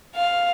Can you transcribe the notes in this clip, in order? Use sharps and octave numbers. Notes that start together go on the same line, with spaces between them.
F5